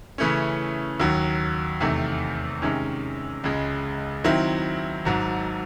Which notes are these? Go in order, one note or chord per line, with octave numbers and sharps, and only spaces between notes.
C#3 E3 A3 C#4
D#2 D#3 F#3
E2 C3 D#3 A3
C3 D#3 G#3 C#4
C#2 C#3 G#3
D#3 F#3 C4 E4
G#1 G#2 F#3